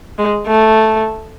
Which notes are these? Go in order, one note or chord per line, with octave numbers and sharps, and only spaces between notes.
G#3
A3